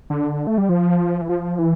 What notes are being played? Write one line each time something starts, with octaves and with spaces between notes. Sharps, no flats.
D3
A3
G3
F3
E3
F3
E3